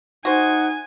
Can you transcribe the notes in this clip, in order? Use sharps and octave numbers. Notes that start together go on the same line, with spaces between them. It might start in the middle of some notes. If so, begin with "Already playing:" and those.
D#4 F#4 C5 F#5 G#5